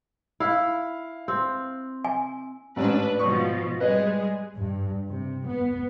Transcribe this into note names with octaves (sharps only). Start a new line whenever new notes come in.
E4 F5
C4
G#5
A1 G#2 C#4 D4 B4
G#2 B2 F3 C#6
G3 G#3 G#4 B4 D#5
G2
C3
B3